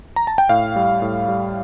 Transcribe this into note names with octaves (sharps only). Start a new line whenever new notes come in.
A#5
A5
G5
A2 F5
G3
A2
G3